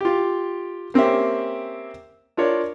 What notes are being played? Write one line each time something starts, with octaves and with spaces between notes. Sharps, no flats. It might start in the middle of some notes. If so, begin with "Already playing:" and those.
F4 G4
A#3 C4 C#4 G4 E5
D4 F4 A#4 C#5 D5